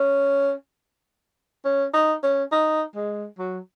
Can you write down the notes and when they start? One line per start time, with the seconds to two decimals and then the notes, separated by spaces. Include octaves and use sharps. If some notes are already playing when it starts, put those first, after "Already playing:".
Already playing: C#4
1.65 C#4
1.94 D#4
2.23 C#4
2.52 D#4
2.96 G#3
3.38 F#3